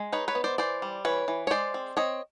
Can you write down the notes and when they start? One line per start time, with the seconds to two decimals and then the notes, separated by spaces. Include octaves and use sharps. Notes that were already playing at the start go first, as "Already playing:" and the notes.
Already playing: G#3
0.12 D#4 B4 C#5
0.28 B4 C#5
0.35 B3
0.44 C5 D5
0.58 E3 C5 D5
0.82 G3
1.05 E3 B4 C#5
1.28 E3
1.47 C#5
1.50 G#3 C5 D5
1.74 C4
1.97 C4 C#5 D#5